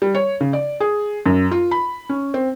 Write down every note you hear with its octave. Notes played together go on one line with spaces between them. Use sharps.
G3
C#5
C#3
D5
G#4
F#2
F4
B5
C#4
C4